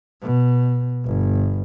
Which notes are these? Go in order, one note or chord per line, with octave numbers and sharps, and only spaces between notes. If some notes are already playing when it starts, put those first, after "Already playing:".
B2
G1